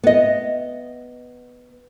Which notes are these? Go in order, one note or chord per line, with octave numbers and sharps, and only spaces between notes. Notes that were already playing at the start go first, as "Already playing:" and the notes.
B3 D#5